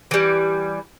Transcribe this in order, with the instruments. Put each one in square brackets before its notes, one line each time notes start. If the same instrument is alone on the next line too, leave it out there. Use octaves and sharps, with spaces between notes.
[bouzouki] E3 G3